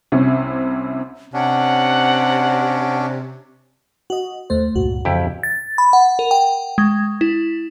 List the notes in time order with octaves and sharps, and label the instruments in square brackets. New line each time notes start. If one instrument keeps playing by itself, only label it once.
[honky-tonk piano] C2 C3 C#4
[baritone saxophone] C3 [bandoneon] C#4 D4 [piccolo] F#5
[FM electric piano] F#4 D#5
D#2 A3 C5
[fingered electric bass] C#2 G2 A#2 [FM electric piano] F#4
[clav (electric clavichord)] F2 E4 G4 [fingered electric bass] C#3 E3
[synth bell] A6
B5
F#5
A#4
G5
G#3
E4